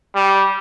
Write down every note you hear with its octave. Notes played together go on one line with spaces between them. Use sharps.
G3